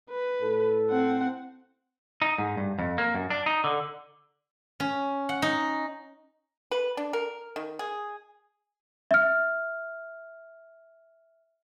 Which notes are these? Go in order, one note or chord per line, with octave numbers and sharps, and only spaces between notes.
B4
A2 A4
C4 F#5
D#4
G#2
G2
F2
A#3
F#2
D4
D#4
D3
C#4
F#5
D#4
B4
D4
A#4
D#3
G#4
E5 F6